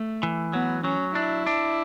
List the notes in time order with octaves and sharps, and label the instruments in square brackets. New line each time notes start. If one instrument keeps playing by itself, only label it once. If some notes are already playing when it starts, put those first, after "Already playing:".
Already playing: [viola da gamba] A3
[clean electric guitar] E3
[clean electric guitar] F#3 [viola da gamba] B3
[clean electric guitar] F#3 [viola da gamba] C#4
[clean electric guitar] D4 [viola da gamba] E4
[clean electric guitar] D4